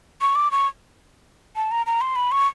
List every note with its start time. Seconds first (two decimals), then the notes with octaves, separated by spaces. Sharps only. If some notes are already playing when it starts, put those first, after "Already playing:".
0.21 C#6
0.35 D6
0.51 C#6
1.56 A5
1.71 A#5
1.86 A#5
2.01 C6
2.16 B5
2.32 C#6